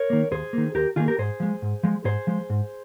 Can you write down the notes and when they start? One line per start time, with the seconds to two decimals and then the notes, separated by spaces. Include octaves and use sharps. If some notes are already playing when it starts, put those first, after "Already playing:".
Already playing: A#4 C#5
0.10 D#3 A#3
0.31 D#2 G#4 C5
0.53 D#3 A#3
0.74 D#2 G4 A#4
0.96 D#3 A#3 F4 G#4
1.08 G4 A#4
1.18 G#2 G#4 C5
1.40 F3 G#3
1.62 G#2
1.83 F3 G#3
2.05 G#2 G#4 C5
2.27 F3 G#3
2.50 G#2